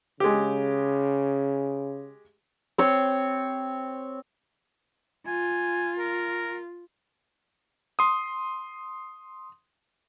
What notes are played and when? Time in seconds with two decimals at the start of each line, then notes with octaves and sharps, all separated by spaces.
0.20 C#3 G#3 G4
2.78 C4 C#5
5.27 F4 G#5
5.99 A#4
7.99 C6 D#6